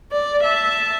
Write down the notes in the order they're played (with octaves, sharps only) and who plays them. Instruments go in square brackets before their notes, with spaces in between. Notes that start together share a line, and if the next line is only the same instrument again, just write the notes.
[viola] D5
E5 A5